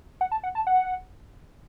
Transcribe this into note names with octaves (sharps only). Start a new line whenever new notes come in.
F#5
A5
F#5
A5
F#5